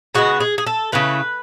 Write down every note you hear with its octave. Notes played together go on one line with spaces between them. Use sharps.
C#3 G#3 B3 F#4
G#4
G#4
A4
C#3 E3 A3 B4